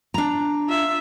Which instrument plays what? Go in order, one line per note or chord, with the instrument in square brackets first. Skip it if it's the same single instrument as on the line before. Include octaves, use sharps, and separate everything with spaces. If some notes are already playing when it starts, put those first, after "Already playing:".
[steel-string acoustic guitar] D4 A#5
[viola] F4 E5